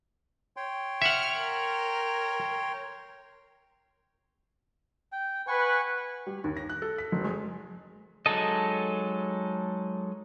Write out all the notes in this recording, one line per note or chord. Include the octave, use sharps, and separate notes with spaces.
C#5 G5 C6
E5 F#5 F6 C#7
A#4
G5
B4 F#5 G#5 C#6
G3
D#2
A#6
F#6
A4
B6
F#1
G#3
F#3 G#3 D#4 A4 D#5